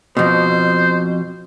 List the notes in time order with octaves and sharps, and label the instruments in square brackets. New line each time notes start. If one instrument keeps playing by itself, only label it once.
[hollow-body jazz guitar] F2 B2 [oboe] C5